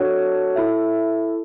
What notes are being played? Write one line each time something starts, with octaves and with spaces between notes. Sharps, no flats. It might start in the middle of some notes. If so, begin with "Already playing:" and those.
Already playing: D4 F#4 A4 C#5 F#5
E4 A4 E5